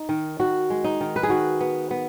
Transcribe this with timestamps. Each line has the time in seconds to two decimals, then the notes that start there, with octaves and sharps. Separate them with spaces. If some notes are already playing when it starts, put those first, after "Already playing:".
Already playing: D#4
0.09 D#3
0.40 D#3 F#4
0.70 G#3
0.84 D#4
1.01 D#3
1.16 B4
1.23 G#4
1.30 D#3 F#4
1.61 B3
1.91 B3